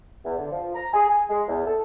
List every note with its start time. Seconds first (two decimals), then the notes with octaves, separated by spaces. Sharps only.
0.24 E2
0.38 D3
0.51 F3
0.75 A#5
0.92 G#4
1.08 G#5
1.29 G#3
1.48 E2
1.66 A4